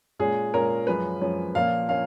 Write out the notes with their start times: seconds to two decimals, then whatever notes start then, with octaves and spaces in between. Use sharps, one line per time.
0.19 A#2 G#3 C#4 G#4
0.54 A#2 G#3 C#4 A#4
0.87 F#2 F3 G#3 C#4 B4
1.21 F#2 F3 G#3 C#4
1.55 A#2 F3 A#3 C#4 F5
1.89 A#3 C#4 F5